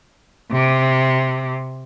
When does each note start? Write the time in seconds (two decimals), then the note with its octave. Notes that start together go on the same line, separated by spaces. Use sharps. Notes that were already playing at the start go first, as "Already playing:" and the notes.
0.52 C3